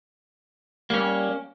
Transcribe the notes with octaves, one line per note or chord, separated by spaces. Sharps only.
G3 A#3 C#4